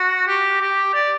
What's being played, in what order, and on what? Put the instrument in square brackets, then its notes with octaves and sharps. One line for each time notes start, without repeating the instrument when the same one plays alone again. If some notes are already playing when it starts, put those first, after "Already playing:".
Already playing: [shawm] F#4
G4
G4
D5